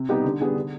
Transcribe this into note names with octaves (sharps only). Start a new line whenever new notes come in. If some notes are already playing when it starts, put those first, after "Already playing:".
Already playing: C3
G3 B3 D#4 G4
D3
G3 B3 D4 G#4
D3